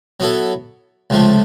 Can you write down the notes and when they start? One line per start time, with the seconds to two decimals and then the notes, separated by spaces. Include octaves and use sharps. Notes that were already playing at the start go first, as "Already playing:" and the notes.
0.20 F#3 B3 E4 A4
1.10 C#2 C3 F3 A3